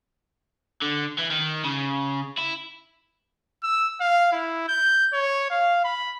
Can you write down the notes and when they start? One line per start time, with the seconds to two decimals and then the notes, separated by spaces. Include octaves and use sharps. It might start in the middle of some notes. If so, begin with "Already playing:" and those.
0.82 D3
1.19 E3
1.31 D#3
1.65 C#3
2.39 E4
3.63 E6
4.01 F5
4.32 E4
4.68 G6
5.13 C#5
5.50 F5
5.84 B5